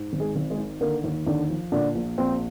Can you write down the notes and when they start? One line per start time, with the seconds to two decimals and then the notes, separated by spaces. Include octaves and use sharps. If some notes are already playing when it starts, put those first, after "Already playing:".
Already playing: G#2
0.13 G#1
0.20 G#3 G#4
0.36 G#1
0.50 G#3 G#4
0.58 D#3
0.81 D3 A#3 A#4
1.04 D#2
1.27 D#2 D3 D4
1.50 F3
1.72 A#2 D3 D4
1.95 A#1
2.18 A#1 C4